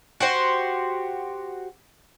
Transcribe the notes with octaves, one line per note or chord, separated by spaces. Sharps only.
F#4 G4 C5